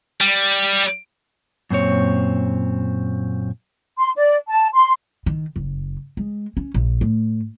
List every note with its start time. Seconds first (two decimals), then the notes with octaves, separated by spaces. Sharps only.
0.21 G3
1.70 F#2 A#2 C4 C#5
3.99 C6
4.16 D5
4.48 A5
4.74 C6
5.26 D#3
5.56 F#1
6.17 G#3
6.57 C#4
6.74 A#1
7.01 A2